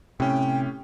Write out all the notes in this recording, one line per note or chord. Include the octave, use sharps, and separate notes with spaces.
A2 C3 C#4 G5